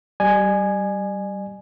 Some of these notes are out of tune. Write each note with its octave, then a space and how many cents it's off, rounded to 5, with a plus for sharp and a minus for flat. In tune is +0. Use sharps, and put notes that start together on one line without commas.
G3 -20 D5 +45 G#5 +0